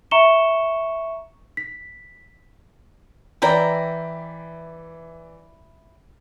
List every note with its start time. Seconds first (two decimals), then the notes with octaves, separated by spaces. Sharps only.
0.11 E5 A#5 C#6 C#7 E7 G7
1.57 B6
3.42 E3 E4 D5 G5 A#5